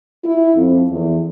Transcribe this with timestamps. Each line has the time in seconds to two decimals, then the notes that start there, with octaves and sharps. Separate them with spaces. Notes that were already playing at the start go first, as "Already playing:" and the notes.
0.25 E4
0.55 F2
0.90 E2